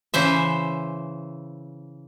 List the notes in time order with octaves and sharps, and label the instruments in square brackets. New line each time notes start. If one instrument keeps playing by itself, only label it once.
[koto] C#3 E3 C5 E5